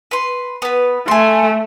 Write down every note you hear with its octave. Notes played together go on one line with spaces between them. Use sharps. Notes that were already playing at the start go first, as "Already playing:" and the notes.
B4 C6
B3 B4
A3 G#5 C6